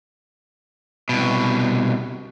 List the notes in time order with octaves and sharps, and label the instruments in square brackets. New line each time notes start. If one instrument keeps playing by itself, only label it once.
[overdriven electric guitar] C2 B2